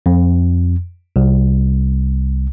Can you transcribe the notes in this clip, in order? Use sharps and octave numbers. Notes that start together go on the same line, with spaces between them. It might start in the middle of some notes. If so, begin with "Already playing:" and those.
F2
C2